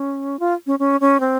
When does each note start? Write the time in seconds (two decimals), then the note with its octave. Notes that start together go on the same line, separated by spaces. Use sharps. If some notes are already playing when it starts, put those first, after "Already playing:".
Already playing: C#4
0.39 F4
0.67 C#4
0.79 C#4
1.01 C#4
1.20 C4